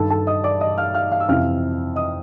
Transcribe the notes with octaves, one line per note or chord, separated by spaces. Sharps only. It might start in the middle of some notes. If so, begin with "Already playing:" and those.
Already playing: G2 D#3 A4 A5
A4 A5
D#5 D#6
D5 D6
D#5 D#6
F5 F6
F5 F6
F5 F6
E6
F2 C3 E3 F5 F6
D#5 D#6